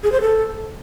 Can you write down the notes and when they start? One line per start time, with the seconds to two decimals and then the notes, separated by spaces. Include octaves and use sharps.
0.03 G#4
0.12 C5
0.21 A4